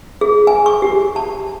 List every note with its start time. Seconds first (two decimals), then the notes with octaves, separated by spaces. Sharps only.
0.21 G#4
0.47 G#5
0.66 C#6
0.82 G4
1.16 A5